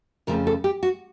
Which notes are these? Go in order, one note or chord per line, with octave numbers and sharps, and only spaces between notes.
F2 C#3 F3 A3 A#4
A4
G4
F#4